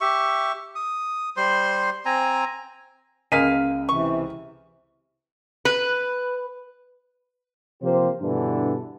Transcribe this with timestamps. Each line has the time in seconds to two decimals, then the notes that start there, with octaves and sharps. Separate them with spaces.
0.01 G4 E5 C#6
0.75 D#6
1.37 G3 C5 C6
2.06 C4 G#5 A#5
3.32 C#2 G#3 A#3 F5 F6 B6 D#7
3.89 C3 E3 C#6
5.65 B4
7.83 C3 F3 A#3 G4 C5
8.21 G2 B2 D3 E3 D4